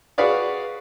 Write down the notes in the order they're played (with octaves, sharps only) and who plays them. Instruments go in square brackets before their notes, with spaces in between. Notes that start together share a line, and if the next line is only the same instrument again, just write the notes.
[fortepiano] F#4 G#4 B4 D5 F5